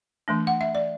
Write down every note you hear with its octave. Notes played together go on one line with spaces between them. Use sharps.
E3 A3 D4
F#5
E5
D5